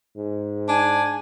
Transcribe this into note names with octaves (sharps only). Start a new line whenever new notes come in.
G#2
D4 G#5